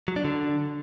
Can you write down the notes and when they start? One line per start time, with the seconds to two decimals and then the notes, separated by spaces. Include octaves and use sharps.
0.08 F#3
0.16 D4
0.24 D3